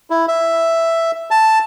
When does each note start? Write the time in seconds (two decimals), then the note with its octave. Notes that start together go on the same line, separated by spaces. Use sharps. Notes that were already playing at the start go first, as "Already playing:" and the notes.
0.10 E4
0.28 E5
1.31 A5